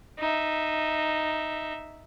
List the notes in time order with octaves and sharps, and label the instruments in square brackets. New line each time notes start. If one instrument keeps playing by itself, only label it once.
[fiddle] D#4 E5